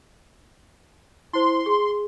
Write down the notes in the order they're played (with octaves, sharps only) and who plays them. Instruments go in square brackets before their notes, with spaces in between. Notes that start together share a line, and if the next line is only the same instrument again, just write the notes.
[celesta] E4 C5 [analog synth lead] C6
[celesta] G#4